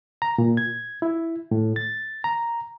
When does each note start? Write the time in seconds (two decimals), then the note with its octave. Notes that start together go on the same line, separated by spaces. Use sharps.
0.22 A#5
0.38 A#2
0.57 G#6
1.02 E4
1.51 A2
1.76 A6
2.24 A#5